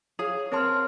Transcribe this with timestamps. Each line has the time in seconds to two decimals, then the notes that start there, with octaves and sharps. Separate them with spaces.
0.19 G#4 C#5 F5
0.52 C4 A#4 C#5 A5 C6 F6